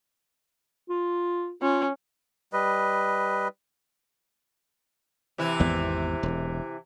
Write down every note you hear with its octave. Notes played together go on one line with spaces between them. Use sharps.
F4
C#4 F4
G3 B4 D#5
C3 E3 E4
G#1 E2 B3
E1